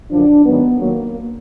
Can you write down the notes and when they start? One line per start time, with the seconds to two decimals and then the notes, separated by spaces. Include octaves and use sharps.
0.11 F#2 D3 F3 D4
0.45 G#2 D#3 F#3 B3
0.80 D#2 D#3 F#3 A#3